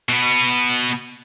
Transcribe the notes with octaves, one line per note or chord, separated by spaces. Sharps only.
B2 B3